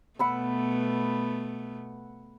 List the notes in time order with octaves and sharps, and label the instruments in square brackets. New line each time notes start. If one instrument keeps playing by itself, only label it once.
[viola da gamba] B2 A3 B3 [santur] F#5 B5 E6